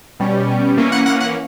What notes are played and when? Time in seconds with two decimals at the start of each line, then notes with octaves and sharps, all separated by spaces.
0.20 B2 G3 C#4
0.77 E3 A#3 C#4
0.92 F#5
1.06 F#5
1.21 F#5